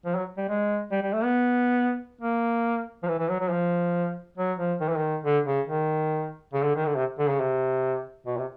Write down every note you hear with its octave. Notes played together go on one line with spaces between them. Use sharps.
F3
F#3
G3
G#3
G3
G3
A3
B3
A#3
F3
E3
E3
F#3
F#3
F3
F#3
F3
D#3
E3
D#3
D3
C#3
D#3
C#3
D3
D#3
D3
C3
D3
C#3
C3
B2
C3